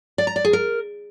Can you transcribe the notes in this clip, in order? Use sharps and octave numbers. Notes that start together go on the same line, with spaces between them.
D5
A#5
D5
G#4
A#4